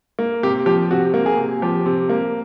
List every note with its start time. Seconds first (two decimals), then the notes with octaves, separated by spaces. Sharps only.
0.19 A#3
0.43 C3 G4
0.66 F3 G4
0.91 C3 F#4
1.14 A#3
1.26 G#4
1.37 C3
1.62 F3 G4
1.86 C3
2.09 A#3